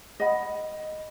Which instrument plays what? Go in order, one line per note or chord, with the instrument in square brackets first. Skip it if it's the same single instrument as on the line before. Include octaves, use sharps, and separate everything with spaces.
[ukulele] D#5 F#5 B5